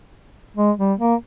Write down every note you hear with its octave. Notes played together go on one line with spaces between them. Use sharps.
G#3
G3
A#3